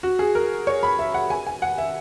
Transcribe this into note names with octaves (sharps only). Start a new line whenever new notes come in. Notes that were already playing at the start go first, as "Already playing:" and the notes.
F#4
G#4
A#4
C#5
B5
E5
F#5
G#5
G#5
F#5
E5